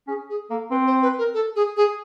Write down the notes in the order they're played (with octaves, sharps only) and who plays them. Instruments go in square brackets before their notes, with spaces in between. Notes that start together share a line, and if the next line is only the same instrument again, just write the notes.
[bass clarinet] C#4 [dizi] G#4
[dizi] G#4
[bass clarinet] A#3 [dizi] A4
[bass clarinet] C4 [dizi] B4
[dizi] C5
B4
A#4
A4
G#4
G#4